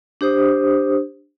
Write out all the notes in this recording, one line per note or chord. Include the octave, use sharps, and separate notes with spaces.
D4 G4 C5 D#6